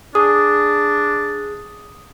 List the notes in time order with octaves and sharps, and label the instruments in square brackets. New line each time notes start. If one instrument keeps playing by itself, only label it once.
[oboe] D4 [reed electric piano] G#4 [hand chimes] D#6